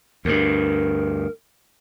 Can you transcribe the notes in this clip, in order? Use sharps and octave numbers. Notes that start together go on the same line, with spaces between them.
D2 G2 A#4